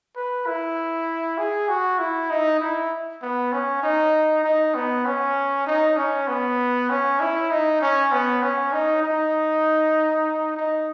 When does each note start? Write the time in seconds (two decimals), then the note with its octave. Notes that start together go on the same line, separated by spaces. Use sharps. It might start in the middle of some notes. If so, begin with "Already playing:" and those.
0.16 B4
0.47 E4
1.38 G#4
1.69 F#4
1.99 E4
2.30 D#4
2.60 E4
3.22 B3
3.53 C#4
3.83 D#4
4.44 D#4
4.75 B3
5.06 C#4
5.66 D#4
5.97 C#4
6.28 B3
6.90 C#4
7.20 E4
7.51 D#4
7.81 C#4
8.12 B3
8.43 C#4
8.73 D#4
9.03 D#4
10.56 D#4